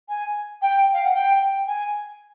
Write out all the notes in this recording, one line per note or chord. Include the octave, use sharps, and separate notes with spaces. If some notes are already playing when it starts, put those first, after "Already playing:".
G#5
G5
F5
F#5
G5
G#5